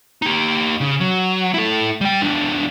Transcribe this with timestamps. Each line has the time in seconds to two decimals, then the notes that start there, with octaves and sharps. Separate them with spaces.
0.22 D#4 G4
0.81 C#3
1.00 F#3
1.54 E4 A4
2.01 G3 G5
2.21 E2 D4